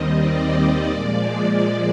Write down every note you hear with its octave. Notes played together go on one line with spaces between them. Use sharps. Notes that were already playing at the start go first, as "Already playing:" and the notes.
Already playing: D#2 D#3 G3 C4 D#5
D5
A#2 F3 G#3 D5